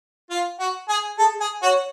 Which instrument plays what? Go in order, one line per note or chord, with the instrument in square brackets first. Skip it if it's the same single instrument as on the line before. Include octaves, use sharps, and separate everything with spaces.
[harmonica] F4
F#4
G#4
[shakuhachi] G#4 [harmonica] A4
[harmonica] G#4
[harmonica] F#4 [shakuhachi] C#5